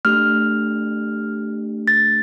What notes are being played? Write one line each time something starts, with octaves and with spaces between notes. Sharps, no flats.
A3 D4 G4 F6
A6